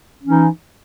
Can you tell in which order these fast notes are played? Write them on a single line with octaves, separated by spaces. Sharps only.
C#4 E3 D#4